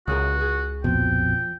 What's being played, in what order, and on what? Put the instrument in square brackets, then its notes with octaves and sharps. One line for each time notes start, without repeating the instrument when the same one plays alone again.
[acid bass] C#2 [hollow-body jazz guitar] C#3 G#4 A#4 [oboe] F#4
[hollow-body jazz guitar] G#4
[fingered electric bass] A#1 F2 B2 [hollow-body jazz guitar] F3 [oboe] G5